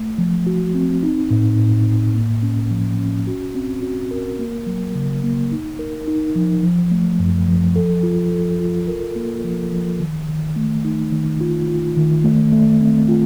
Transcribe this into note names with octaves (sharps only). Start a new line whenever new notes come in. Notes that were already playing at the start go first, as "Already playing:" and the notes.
Already playing: A3
F3
F#4
C4
D#4
A2
A2
A2
A#3
C#4
F3
C#4
F#4
C4
F#4
A#4
A#3
F#3
C#3
A#3
D#4
A#4
D#4
F3
F3
A3
F#2
F3
A4
F4
A4
F4
A#4
A#3
F3
F3
D#3
D#3
A3
D#4
D#3
F4
F4
D#3
A3
A3
C4
F4